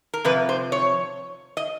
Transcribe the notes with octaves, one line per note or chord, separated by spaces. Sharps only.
A#4
F2 C3 B4
C5
C#5
D#5